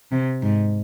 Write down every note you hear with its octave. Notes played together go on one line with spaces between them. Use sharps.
C3
G#2